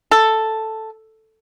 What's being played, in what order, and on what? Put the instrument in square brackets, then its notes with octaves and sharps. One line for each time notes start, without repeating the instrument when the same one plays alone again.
[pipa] A4